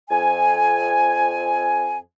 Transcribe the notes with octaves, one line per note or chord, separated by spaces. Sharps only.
F2 G#5